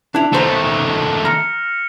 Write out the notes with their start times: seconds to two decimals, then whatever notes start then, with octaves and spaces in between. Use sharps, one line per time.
0.15 D4 E4 F#6 F7
0.33 B1 D#3 A3 C5 A#5 E7 F7
1.25 A#5 F6 A#6 C#7